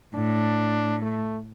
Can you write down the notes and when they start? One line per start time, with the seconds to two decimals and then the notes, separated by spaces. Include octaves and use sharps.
0.14 A2 D4
1.02 A3